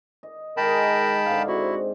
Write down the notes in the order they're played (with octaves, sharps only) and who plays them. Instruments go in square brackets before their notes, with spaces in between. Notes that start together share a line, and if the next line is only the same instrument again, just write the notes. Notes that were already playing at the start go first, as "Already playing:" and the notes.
[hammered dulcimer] D#5
[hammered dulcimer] D#3 G#3 G#4 [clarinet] A#4 [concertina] G5 A5 B5
[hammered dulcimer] G#2 D3 [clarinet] F5
[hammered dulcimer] C4 [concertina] E4 [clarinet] F#4